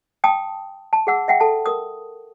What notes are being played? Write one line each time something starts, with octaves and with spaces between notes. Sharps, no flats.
G5 A5 D#6
A5
G#4 F#5 E6
E5 F#5 G5
A4 A5
A#4 D#6